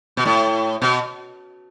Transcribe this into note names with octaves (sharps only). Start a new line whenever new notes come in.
B2
A2
B2